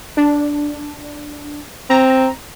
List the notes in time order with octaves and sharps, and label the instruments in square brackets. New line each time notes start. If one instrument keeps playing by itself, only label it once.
[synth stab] D4
[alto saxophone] C4 [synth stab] A#5